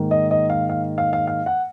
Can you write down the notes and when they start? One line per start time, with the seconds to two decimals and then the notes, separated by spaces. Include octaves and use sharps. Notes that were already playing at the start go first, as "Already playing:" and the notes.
Already playing: G#2 D#3 A#3
0.11 D#5
0.31 D#5
0.50 F5
0.69 F5
0.98 F5
1.13 F5
1.27 F5
1.46 F#5